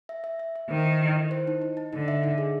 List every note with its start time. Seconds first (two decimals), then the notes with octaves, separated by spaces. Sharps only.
0.09 E5
0.24 E5
0.39 E5
0.55 E5
0.70 D#3 C5
0.85 E4
1.01 E4
1.16 E4
1.31 C5
1.47 D#4
1.61 D#4
1.77 D#4
1.93 D3 D#4
2.08 E5
2.23 D#4
2.38 G#4